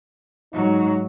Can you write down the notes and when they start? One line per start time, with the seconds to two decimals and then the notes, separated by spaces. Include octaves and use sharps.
0.53 G#2 F#3 D#4